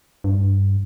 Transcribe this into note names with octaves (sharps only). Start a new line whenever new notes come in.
G2